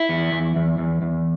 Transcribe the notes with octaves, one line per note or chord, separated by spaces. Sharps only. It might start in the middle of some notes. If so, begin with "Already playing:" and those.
Already playing: E4
E2
E2
E2
E2
E2